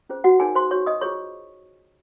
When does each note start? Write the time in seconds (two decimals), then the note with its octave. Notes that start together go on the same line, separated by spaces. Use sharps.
0.09 C#4 F4 G#4 C5
0.24 F#4 F#5
0.39 D#4 G#4 A#4 C#5 G#5
0.55 C5 C6
0.71 F#4 C#5 C#6
0.86 D#5 D#6
1.01 F4 G#4 C5 C#5 C#6